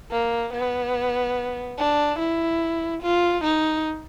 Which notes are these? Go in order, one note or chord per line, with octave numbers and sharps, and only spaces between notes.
A#3
B3
D4
E4
F4
D#4